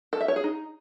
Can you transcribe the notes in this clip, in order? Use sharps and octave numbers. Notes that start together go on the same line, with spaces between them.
A4
E5
C#5
G#4
D#4